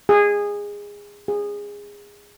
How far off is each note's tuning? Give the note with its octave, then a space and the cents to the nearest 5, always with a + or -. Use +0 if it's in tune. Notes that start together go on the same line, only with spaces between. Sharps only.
G#4 -20
G#4 -20